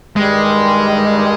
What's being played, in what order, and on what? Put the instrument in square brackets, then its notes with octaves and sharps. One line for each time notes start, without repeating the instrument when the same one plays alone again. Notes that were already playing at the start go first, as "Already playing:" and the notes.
[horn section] G2 D#3 G3 [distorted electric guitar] G#3